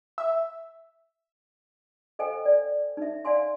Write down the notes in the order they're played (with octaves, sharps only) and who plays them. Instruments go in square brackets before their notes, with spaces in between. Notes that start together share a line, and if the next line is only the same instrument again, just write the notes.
[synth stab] E5
[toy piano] A4 C5 D#5 F5 G5 G#5
D5
D#4 E5
D5 F5 G#5 C6